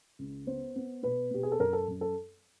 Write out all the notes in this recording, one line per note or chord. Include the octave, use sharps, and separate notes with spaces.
C#2
B3 C5
B3
B2 B4
B2 G4
G#4
A4
F#2 A#4
A4
F#2
A4